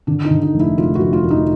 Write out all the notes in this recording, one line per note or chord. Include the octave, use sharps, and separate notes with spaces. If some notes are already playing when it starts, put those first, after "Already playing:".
D3 D4
D#4
D3
D#4
F1
E4
F1 F4
F#4
F1
F4
F1
D#4